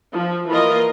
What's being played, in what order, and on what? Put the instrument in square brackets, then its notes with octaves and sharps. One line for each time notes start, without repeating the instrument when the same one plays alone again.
[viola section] F3
E3 A#3 F4 A#4 D#5